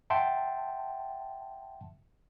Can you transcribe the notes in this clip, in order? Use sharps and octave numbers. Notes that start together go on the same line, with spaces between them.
E5 F#5 G5 A5 C6